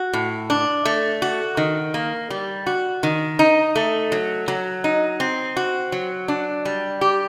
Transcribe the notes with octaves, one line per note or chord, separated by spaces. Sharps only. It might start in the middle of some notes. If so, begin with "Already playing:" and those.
Already playing: F#4
A2
D4
A3
F#4
D#3
A#3
G3
F#4
D#3
D#4
A3
F#3
F#3
D#4
C4
F#4
F#3
D4
G3
G4